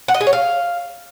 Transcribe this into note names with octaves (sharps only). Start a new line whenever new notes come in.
F#5
D#5
G#4
C#5
F5